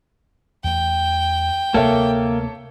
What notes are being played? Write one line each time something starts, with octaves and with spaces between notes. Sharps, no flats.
E2 A3 G5
D2 C3 A#3 A4 C#5 E5